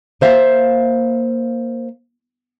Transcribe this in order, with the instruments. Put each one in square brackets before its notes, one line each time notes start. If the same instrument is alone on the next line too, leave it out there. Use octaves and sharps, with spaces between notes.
[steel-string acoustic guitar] A#3 C5 E5 F5